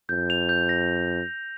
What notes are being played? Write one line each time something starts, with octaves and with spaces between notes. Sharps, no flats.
F2 G6
F7
G6
A#6